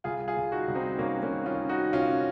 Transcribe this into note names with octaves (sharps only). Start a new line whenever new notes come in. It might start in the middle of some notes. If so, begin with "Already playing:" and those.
C2 F4 G#4
F4 G#4
C2
D#4 F#4
C2
C4 D#4
C2 A#3 C#4
A#3 C#4
D#3
C#4 F4
D#3
D#4 F#4
C3 C#4 F4